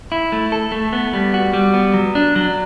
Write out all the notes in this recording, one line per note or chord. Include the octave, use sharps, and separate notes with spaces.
E4
A3
A4
A3
B3
G3
F#4
G3
B3
F#3
D4
F#3